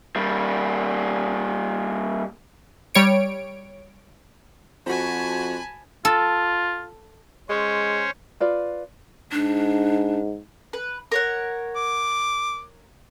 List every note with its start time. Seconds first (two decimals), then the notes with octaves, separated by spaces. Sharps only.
0.16 G3 A#3
2.95 G3 C#5 D7
4.86 F2 F#4 C5 G#5 A5 B5
6.05 F4 A4
7.49 G#3 C#4 C5 C#5
8.40 F4 B4 D5
9.32 G#2 D4
10.73 B4
11.12 A#4 C#5 F#5
11.76 D6